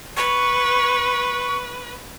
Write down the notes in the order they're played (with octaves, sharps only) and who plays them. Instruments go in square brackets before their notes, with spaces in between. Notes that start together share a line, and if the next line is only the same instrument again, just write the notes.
[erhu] B4 [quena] C#6